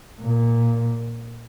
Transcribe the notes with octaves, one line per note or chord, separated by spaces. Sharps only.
A#2